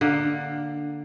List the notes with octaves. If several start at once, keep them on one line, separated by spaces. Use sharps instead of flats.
D3 A#3